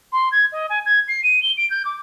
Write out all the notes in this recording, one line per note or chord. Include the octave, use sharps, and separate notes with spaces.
C6
G#6
D#5
G#5
G#6
C7
D#7
G7
D7
G6
D6